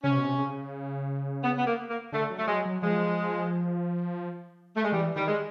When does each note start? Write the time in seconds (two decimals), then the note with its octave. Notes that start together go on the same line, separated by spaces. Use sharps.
0.03 C#3 C#4
0.11 C3
0.18 B2
0.25 C3
0.38 C#3
1.44 B3
1.57 B3
1.67 A#3
1.90 A#3
2.12 D3 A3
2.30 F#3
2.38 A3
2.47 F#3 G#3
2.65 F#3
2.82 F3 G#3
4.76 A3
4.84 G#3
4.92 E3 G3
5.16 D#3 G3
5.27 G#3